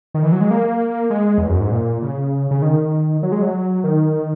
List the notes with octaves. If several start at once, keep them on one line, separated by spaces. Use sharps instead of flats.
D#3
E3
F#3
G#3
A#3
G#3
E2
F#2
G#2
A#2
C#3
C#3
D#3
F#3
G#3
F#3
D#3